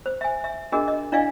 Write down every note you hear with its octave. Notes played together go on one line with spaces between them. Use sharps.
C5
E5 G#5
E5
D4 F#4 G#4 A#4 D#5
D#5
D4 E4 D5 D#5 F5 G#5